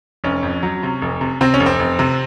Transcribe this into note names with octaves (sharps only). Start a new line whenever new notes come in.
F1 C#4
F2
F#3
C3
F1
C3
C3 C4
C#4
F1
C4
F1
C3